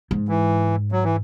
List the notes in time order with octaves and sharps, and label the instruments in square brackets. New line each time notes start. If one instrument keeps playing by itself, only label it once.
[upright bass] G#2
[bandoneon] E3
F#3
E3